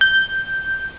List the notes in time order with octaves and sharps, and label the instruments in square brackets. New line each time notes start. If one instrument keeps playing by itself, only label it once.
[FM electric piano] G6